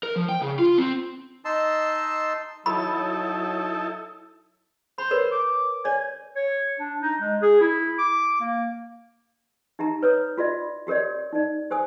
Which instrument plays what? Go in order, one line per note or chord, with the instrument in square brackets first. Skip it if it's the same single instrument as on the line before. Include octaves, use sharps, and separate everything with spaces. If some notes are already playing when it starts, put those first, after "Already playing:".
[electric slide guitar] A#4
F3
G5
C#3
F4
C4
[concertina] D#4 D#5 A5 C6 E6
[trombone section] F#3 [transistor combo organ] D#4 E4 A4 [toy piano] B5
[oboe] C5 [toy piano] B5
[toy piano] A#4 B4 C#5
[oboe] D6
[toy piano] C#5 D5 [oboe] G#5
[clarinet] C#5
D4
D#4
G#3
G#4
E4
D6
A#3
[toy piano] D#4 G4 E5 A#5
B4 C#5 D#6
F4 F#4 D5 E5
F#4 G4 A#4 C#5 D5
D#4 D5
G4 C5 G#5 D#6